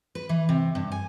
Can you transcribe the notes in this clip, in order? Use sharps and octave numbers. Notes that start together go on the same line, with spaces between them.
B4
E3
C3
G2
G#5